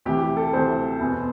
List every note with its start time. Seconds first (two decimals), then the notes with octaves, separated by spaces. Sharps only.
0.05 D2 C3 E3 G4
0.21 G4
0.37 A4
0.53 D2 C3 E3 C5
1.00 E2 B2 B3